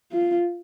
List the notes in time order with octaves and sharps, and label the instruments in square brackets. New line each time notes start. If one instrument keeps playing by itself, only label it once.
[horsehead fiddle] F4